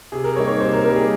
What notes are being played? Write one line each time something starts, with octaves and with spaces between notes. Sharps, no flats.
C3 G#4
A#4
G3 A#3 D#4 C#5
C#5
C3 C5
A#4
G3 A#3 D#4 A#4
G#4